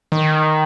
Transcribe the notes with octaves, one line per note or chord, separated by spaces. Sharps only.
D#3